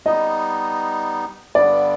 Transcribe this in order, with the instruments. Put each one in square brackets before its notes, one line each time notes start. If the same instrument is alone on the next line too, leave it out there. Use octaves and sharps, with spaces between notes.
[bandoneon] G3 B3 D#4 [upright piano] D#5
[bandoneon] G2 D3 G3 B3 [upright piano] D5